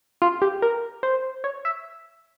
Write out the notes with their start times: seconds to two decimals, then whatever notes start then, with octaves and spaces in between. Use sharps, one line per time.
0.22 F4
0.42 G4
0.62 A#4
1.03 C5
1.44 C#5
1.65 E5